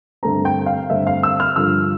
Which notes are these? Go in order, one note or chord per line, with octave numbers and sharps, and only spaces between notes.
G2 D3 A3 C4 A#5
G5
F5
G2 D3 A3 C4 E5
F5
E6
F6
G2 D3 F3 E6